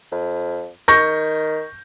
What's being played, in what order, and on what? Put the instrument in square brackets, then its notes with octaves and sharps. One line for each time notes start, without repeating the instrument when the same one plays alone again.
[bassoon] F2
[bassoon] D#3 [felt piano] C#6 G6 A#6